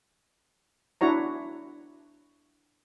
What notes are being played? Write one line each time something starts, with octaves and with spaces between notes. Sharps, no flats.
D4 E4 F#4 C#5 A#5